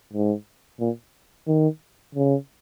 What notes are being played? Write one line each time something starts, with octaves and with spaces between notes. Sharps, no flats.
G#2
A#2
D#3
C#3